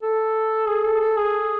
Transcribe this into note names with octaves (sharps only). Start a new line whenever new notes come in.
A4
G#4
A4
A4
G#4